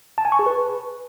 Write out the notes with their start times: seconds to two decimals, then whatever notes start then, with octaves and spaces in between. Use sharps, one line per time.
0.18 A5
0.25 G#5
0.32 C#6
0.39 G#4
0.46 B4